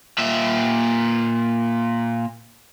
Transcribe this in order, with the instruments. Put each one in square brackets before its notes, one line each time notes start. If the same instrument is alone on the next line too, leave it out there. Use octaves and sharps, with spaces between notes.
[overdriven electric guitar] A#2 E5